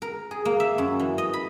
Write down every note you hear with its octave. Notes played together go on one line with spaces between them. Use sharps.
A#4
G#4
A#3
E5
F#2
E3
D#5
B5